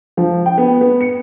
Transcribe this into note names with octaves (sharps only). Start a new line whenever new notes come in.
F3
G5
B3
B3
C#7